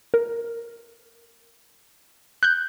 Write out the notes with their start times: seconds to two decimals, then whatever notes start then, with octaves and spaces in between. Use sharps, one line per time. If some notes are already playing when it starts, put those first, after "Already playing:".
0.14 A#4
2.43 F#6 G6